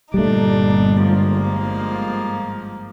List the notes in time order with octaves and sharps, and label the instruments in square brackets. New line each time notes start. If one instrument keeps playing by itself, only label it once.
[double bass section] G1 [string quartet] A#2 D4 D#4 [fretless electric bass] G3 A3
[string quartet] G#2 F3 A#3